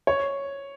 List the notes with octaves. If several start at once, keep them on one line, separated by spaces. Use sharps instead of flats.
C#5